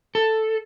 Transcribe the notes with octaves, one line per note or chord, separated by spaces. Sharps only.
A4